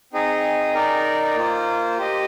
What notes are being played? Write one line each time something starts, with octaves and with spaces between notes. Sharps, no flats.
C4 D#4 G#4 D#5
D#4 A#4 D5 G5
A#3 F4 C5
G4 C5 D#5